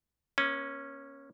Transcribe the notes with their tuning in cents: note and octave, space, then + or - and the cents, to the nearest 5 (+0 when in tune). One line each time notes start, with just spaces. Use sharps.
A#3 +35 C#4 -10